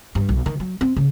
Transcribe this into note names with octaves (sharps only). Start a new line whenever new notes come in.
G2
B1
D#3
F#3
C4
C#3